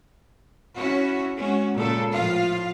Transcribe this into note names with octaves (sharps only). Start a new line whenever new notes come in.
C#4 E4 F#4
G#3 C#4 F#4
A#2 C#3 G#3 A4
A2 F3 F4 F5